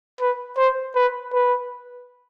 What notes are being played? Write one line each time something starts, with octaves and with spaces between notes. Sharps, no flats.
B4
C5
B4
B4